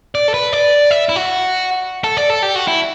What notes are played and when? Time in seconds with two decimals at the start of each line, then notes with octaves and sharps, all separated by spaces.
0.15 D5
0.28 A4
0.34 B4
0.53 D5
0.91 E5
1.09 E4
1.16 F#4
2.04 A4
2.17 D5
2.30 A4
2.42 G4
2.55 F#4
2.68 E4